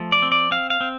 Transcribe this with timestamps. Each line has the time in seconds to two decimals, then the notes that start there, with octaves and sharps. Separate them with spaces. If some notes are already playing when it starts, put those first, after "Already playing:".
Already playing: F3 A3
0.12 D5
0.22 C4
0.32 D5
0.51 C4 F5
0.70 F5
0.81 C4